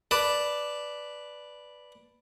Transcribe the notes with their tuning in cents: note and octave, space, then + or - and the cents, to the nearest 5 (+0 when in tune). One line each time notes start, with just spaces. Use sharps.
B4 +0 D5 +0 A5 +0